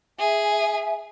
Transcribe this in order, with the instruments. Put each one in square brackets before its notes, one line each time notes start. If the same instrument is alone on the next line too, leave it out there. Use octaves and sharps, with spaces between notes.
[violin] G#4 [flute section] E5 G#5